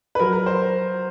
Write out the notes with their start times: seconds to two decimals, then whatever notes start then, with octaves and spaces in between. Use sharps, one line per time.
0.15 B4
0.19 F#3 A#4
0.33 A#4
0.46 C5